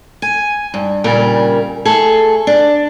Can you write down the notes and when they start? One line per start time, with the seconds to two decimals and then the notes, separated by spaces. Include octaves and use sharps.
0.22 G#5
0.74 G2
1.04 A#2 C#3 G3 A#4
1.85 A3 G#4 A4
2.47 D4